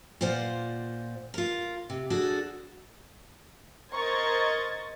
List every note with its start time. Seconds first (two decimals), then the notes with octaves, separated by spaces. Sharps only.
0.21 A#2 F4 C5 D5 F#5
1.34 F4 A#4
1.90 C3
2.10 D4 F#4 G#4 A4
3.93 A#4 C5 D#5 C#6 G#6 A6